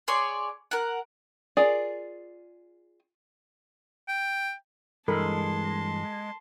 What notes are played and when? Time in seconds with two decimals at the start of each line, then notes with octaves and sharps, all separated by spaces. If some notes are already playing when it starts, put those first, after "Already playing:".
0.08 G#4 C#5 D5 C6
0.71 A#4 F#5
1.57 F4 G#4 A#4 D5
4.08 G5
5.08 G2 E3 G#3 A4 A#4 A5 B5 C6